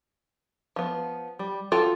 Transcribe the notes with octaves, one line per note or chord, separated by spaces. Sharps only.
F3 B3
G3
F4 F#4 A4 G5